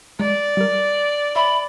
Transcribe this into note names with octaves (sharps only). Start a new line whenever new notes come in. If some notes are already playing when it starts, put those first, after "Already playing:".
G#3 D5
G3 A#4
C#5 E5 B5 C6